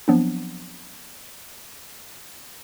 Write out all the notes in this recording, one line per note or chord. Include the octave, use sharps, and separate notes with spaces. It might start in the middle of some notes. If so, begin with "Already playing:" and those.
F3 F#3 B3 C4 D4